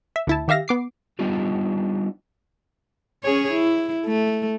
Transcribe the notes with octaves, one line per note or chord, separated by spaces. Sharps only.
E5
D2 E4 A5
D#3 G4 E5 F5 A#6
B3 D6 C7
G3 B3 D4 D#4 F4 G4
C#4 G#4 C#5
E4
A3